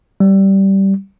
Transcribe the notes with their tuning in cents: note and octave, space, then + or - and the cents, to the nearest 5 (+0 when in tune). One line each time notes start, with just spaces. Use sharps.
G3 -15